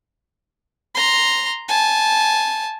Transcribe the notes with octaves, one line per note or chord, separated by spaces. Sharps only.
A#5 C6
G#5 A5